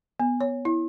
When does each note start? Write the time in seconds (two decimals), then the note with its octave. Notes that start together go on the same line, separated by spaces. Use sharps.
0.20 B3
0.41 C#5
0.65 E4